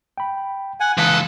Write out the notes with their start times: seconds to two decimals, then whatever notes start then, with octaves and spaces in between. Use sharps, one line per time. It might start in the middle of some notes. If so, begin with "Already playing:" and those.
0.18 G5 B5
0.80 F#5 G#5
0.98 C#2 E3 A4 F5 D#6 F#6 B6